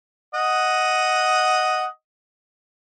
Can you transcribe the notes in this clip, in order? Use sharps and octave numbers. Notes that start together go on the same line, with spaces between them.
D#5 F#5